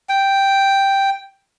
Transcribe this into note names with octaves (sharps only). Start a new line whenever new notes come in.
G5